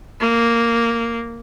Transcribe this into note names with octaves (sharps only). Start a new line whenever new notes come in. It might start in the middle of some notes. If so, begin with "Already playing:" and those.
A#3